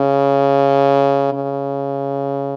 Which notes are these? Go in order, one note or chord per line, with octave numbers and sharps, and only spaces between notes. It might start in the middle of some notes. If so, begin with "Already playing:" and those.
Already playing: C#3
C#3